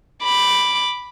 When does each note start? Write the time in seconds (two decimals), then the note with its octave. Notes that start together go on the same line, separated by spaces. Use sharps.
0.23 B5 D6